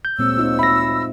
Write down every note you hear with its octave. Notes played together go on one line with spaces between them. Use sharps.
G6
D2 A#2 G#3 C4 C#5 E6
C4 D#4 F4
E5 B5 A#6